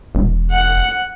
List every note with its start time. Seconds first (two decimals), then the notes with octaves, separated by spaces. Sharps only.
0.15 E1
0.52 F#5